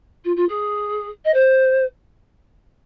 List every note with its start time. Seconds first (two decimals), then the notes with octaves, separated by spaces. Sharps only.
0.24 F4
0.36 F4
0.48 G#4
1.24 D#5
1.34 C5